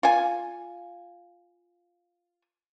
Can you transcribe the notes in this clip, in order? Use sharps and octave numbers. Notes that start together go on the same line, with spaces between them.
F4 G#5